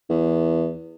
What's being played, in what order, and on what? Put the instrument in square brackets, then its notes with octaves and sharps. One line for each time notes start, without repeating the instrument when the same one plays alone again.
[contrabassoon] E2